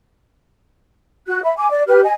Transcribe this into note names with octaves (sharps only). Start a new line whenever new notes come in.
F#4 F#6
E5 B5
G#5 D6
D5
G4 B4 F6
D#5 G#5